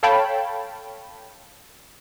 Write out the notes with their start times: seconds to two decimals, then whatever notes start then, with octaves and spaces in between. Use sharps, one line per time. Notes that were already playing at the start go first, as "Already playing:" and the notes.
0.03 A4 C#5 F5 G5 A5 B5